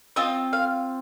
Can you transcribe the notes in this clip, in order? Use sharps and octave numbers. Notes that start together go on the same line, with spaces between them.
C4 F4 D#5
F5